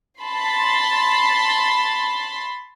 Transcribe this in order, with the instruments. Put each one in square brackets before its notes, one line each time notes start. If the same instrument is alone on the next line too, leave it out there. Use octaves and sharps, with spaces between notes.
[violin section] A5 B5 C6